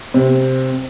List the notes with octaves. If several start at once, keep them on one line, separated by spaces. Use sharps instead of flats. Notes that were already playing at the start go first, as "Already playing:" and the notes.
C3